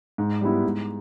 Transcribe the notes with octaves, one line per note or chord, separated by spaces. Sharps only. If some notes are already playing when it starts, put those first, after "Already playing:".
G#2
G3 B3 E4
G#2